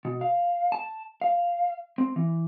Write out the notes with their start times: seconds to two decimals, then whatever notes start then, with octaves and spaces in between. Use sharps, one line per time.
0.05 B2
0.21 F5
0.72 A5
1.22 F5
1.98 C4
2.16 E3